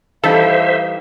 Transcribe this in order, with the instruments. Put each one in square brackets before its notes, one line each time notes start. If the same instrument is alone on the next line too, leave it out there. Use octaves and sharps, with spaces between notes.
[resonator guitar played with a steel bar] E3 G3 D#4 [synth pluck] A4 [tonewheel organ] C5 E5 [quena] F5